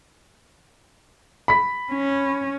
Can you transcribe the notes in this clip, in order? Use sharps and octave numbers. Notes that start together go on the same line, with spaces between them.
B5 B6
C#4